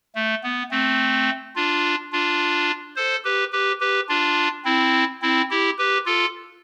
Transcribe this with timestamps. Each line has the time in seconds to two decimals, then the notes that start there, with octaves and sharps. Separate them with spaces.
0.15 A3
0.43 B3
0.71 A3 C4
1.56 D4 F4
2.12 D4 F4
2.96 A4 C5
3.24 G4 B4
3.52 G4 B4
3.80 G4 B4
4.09 D4 F4
4.65 C4 E4
5.22 C4 E4
5.51 E4 G4
5.78 G4 B4
6.06 F4 A4